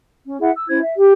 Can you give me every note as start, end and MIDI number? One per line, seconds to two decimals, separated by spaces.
0.25 0.36 61
0.40 0.49 64
0.40 0.49 68
0.40 0.49 76
0.40 0.49 78
0.53 0.66 88
0.67 0.79 61
0.67 0.79 64
0.67 0.79 72
0.67 0.79 92
0.80 0.92 76
0.96 1.13 67